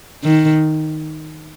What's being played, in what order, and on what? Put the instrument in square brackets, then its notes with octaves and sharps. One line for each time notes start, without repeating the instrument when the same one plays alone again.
[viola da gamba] D#3